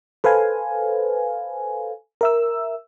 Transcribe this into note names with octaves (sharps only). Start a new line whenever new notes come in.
A4 B4 C5 F5 G#5
A#4 E5 E6